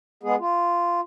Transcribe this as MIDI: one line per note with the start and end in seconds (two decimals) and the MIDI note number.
0.23 0.35 56
0.23 0.35 59
0.23 0.35 68
0.39 1.00 65